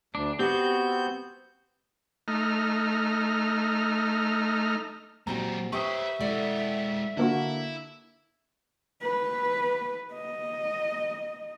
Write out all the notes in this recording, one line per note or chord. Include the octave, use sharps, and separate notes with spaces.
D2 D4
B3 C4 F#4 G4 G6
A3 D#4 F6
A#2 F#3 C4 F#4 G4 A#5
G4 B4 C5 E5 G5 C#6 D#6
G#3 E4 A4 D5 F#5
D3 A#3 E4 F#4
B4
D#5